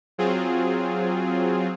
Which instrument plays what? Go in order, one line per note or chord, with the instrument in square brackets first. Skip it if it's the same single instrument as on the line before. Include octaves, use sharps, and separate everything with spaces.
[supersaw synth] F#3 C4 F4 G#4